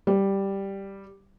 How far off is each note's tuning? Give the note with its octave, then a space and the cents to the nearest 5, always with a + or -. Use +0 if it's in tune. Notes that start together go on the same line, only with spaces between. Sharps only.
G3 +0